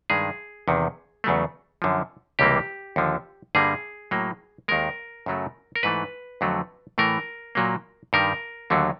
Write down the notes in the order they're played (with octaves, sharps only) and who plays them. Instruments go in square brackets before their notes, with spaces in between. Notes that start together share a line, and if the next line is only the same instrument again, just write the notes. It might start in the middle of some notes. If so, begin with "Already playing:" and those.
[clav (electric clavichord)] G2 D#3 G#3 G#4
E2 C3 D#3
E2 C#3 F#3 A3
F#2 D3 F3
C#2 C3 E3 G3 A#3 G4
D#2 D3 F3
G2 D3 G3 A#3 G#4
A2 F#3 A#3
D#2 D#3 G#3 A#4
F#2 C#3 F#3 A3
A#4
G#2 E3 A3 B4
F2 D3 F#3 A3
A2 E3 A3 A#4
A#2 F#3 A#3
G2 D#3 G3 A#4
D#2 D3 F#3 A3